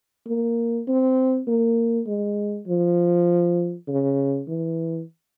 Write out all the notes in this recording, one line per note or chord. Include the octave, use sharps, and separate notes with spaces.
A#3
C4
A#3
G#3
F3
C#3
E3